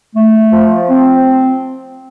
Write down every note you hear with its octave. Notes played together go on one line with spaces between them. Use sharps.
A3
F3
C4